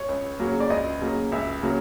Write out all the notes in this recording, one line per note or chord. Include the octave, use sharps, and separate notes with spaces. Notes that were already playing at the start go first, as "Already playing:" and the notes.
Already playing: C#5
C#2
C#3 F#3 A#3
D5
C#2 D#5
C#3 F#3 A#3
C#2 E5
C#3 F#3 A#3